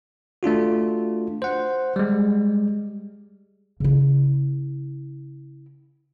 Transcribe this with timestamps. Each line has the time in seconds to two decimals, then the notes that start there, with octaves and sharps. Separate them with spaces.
0.43 A3 D4 F4 F#4
1.42 C5 F#5
1.96 G3 G#3
3.80 C#3 E4